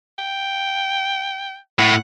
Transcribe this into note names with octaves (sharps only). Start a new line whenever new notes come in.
G5
A2 F#5